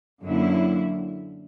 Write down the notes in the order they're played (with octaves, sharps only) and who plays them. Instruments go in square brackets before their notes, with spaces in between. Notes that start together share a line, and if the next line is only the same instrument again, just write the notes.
[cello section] F#2 D3 A#3 E4